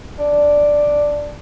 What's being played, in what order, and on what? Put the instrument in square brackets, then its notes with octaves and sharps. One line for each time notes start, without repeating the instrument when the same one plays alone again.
[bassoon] D4